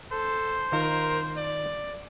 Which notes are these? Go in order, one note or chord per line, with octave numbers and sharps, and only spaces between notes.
A4 C5
D#3 D#4 F4 A#4
D5